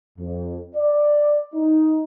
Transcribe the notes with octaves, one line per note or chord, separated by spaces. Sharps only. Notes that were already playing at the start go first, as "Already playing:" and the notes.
F2
D5
D#4